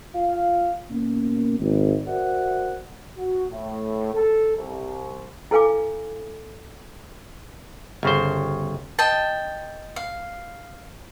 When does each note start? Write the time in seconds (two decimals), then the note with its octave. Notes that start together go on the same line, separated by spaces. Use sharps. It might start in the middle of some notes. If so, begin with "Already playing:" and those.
0.15 F4 F5
0.90 B2 A#3 C#4
1.60 G#1
2.07 F#4 A#4 C5 D5 E5 F#5
3.17 F#4
3.51 A2
4.13 A4
4.56 C2
5.51 E4 A4 B4 F5 G#5 D6
8.03 G1 C#3 C5
8.99 D#5 G5 A5
9.96 F5